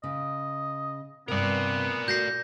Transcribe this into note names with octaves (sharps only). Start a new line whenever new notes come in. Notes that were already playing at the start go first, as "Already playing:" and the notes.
C#3 D#5
G2 C3 B3 A#4 D5
A3 F#4 G6 A#6 C7